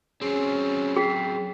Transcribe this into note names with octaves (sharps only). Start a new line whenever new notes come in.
F#3 C4 C#4 G#4
G#4 G5 B6 C7